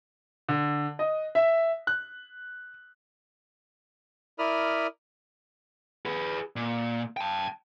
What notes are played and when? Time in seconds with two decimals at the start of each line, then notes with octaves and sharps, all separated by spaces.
0.49 D3
0.99 D#5
1.35 E5
1.87 F#6
4.39 E4 A#4 D5 B5 D#6 F6
6.05 G#4 B4
6.56 A#2
7.17 G5 A5